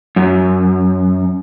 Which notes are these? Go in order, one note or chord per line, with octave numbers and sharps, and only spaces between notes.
F#2